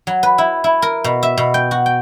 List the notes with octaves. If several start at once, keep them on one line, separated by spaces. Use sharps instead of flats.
F#3
B4
E4
E4
A#4
B2
E5
B2
G5
F#4
G5